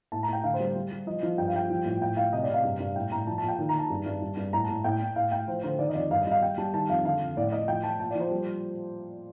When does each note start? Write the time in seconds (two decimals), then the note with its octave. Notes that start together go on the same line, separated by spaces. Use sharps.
0.12 A2 A5
0.23 A#5
0.28 A2 G5
0.44 D3 F5
0.54 C5
0.60 G3
0.76 G3
0.91 G3
1.07 F3 D#5
1.23 F3
1.38 G2 G5
1.48 F5
1.54 G3 G5
1.70 F3
1.86 A2
2.02 A2 G5
2.17 A2 F5
2.33 C3 D#5
2.43 D5
2.49 C3
2.54 F5
2.64 G2
2.80 G2
2.96 A2 G5
3.11 A2 A#5
3.27 F3 A5
3.38 A5
3.43 A#2
3.48 G5
3.59 D#3
3.69 A#5
3.74 D#3 A5
3.90 G2
4.06 G2
4.22 G2
4.37 G2
4.53 A2 A#5
4.64 A5
4.69 A2
4.84 A2 G5
5.00 A2
5.16 A2 F5
5.32 A2 G5
5.48 F3 C5
5.63 D3 C5
5.79 D#3 D5
5.89 D#5
5.95 F2 D5
6.11 G2 F5
6.21 D#5
6.27 G2 F5
6.42 G3 G5
6.58 G3 A5
6.74 D#3 A5
6.89 F2 F5
7.05 D3 F5
7.20 F2
7.37 A2 D5
7.52 A2 D#5
7.68 F3 G5
7.83 F3 A5
8.00 A#2 A5
8.11 D5
8.15 F3 C5
8.31 G3